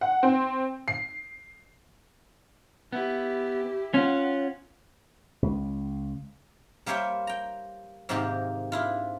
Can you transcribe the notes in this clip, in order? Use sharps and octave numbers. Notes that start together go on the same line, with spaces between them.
F#5
C4
C7
B3 E4 G4
C#4 F4 F#5
C#2
G3 A#3 C5 C#5 E5 G5
G5 A#5
G#2 C3 D#3 A#3 C4 G4
D4 E4 F4